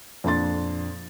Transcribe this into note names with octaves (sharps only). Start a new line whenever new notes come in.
F2 A#2 D4 C6 A6